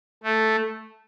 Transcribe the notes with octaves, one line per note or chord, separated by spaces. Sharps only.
A3